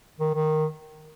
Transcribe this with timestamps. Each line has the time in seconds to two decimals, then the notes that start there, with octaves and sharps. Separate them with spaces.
0.20 D#3
0.34 D#3